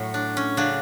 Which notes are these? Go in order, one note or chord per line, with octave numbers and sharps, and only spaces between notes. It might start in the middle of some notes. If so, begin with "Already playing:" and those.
Already playing: A2 F#3
D4
C#4
C#3 F#3 D4